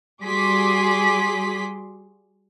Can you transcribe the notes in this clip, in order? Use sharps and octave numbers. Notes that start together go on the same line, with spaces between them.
G3 F#4 G#4 C6 D6 B6